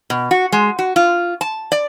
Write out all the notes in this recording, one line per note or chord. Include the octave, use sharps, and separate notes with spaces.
B2
F#4
G#3
F#4
F4
A5
D5